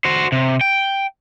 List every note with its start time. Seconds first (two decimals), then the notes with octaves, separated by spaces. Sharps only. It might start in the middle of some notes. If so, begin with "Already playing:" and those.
0.05 F#4 C5
0.32 C3
0.61 G5